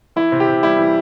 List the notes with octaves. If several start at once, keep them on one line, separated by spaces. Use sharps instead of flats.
E3 E4
C3
G4
C3
G3 E4
E3